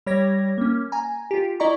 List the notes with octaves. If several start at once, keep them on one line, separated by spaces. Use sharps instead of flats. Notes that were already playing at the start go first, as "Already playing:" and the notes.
G3 G4 C#5 G#6 A#6
A#3 C#4
G#5 A#5
F4 G4
E4 D5 D#5 A#5 C#6